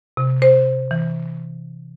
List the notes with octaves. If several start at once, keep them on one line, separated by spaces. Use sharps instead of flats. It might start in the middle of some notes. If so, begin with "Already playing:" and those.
C3
C5
E3